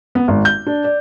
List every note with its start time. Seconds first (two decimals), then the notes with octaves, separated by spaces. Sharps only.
0.15 B3
0.28 G#1
0.45 G6
0.67 D4
0.84 D5